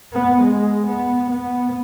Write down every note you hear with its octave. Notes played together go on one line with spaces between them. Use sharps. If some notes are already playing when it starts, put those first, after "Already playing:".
B3
G#3
B3
B3